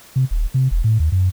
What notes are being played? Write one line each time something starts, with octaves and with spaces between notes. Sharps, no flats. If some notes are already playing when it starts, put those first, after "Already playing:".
C3
D#1
C3
E1
A2
D#2
F#2